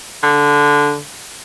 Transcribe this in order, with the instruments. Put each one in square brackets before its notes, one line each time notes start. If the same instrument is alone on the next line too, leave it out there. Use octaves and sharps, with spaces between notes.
[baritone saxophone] D3